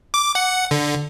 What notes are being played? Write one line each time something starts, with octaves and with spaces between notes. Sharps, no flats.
D6
F#5
D3